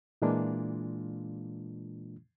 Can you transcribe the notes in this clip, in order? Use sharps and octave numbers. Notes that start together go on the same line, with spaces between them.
A#2 E3 G#3 A#3 D4 F4